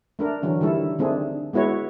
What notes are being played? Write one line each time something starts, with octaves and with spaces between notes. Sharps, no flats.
A3 D4 A#4
D3 E3 F#3 C#4
D3 D#3 G3 A3 E4 A4
D3 D#3 A3 C4 D4 G#4
G#3 B3 E4 F#4 C#5